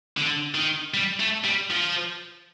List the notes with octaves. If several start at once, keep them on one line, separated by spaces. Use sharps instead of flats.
D3
D#3
G3
A3
G3
F3